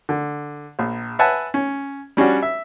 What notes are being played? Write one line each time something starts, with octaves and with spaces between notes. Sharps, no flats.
D3
A#1
B4 E5 F#5 G#5 A5
C#4
G3 C#4 D4 F#4
E5